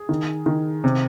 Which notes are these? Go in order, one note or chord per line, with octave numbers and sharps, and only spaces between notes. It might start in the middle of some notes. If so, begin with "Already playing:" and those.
Already playing: G#4
D#3
D#3
C3